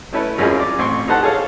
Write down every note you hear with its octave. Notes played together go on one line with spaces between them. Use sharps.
A3 C#4 E4 A4 B4 C#5
G#1 F#2 C#4 F4 G#4
D5
A1 C4 C6 C#6
D#4 G4 A4 C5 F#5 A5
G#4 A4 C#5 F5